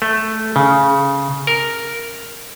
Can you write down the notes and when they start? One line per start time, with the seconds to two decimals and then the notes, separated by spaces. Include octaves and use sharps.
0.02 A3
0.56 C#3
1.47 A#4